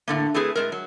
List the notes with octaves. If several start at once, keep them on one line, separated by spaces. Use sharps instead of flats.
A2 D3 A#3
A3 C4 E4 G#4 B4
A2 G#3 A#4
F#3